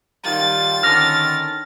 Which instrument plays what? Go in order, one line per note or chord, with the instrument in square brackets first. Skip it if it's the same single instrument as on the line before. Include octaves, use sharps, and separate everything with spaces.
[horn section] D#3 G3 F4 [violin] A6
[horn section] D3 D#3 C#4 [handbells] F6 A#6